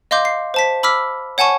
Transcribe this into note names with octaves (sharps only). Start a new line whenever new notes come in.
D#5 F5 C6 D6 G6
C7
C5 A5 B6
B5 D6 E6 F6 B6
C#5 F#5 G#5 A5 C#6